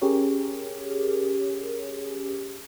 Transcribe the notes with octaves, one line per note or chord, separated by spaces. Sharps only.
C#4 G4 G#4 A#4 C#5